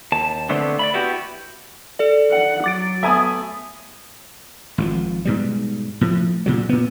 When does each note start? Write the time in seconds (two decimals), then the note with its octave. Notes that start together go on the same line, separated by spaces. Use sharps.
0.12 D#2 A5
0.49 D3 A3 B3 C4 D4
0.79 D5 E5 B5
0.94 B3 E4 F#4 G4
1.99 A4 D5
2.31 F#5
2.64 F#3 D6 A6 D7
3.03 A3 B3 E5 G#5 D#6
4.78 G#1 B2 F3
5.25 G#2 B2 G3
6.01 A2 F3
6.46 A#2 C#3 F#3
6.69 A#2 B3